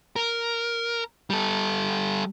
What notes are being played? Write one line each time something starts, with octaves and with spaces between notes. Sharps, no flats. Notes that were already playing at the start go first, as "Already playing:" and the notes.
A#4
G3 A4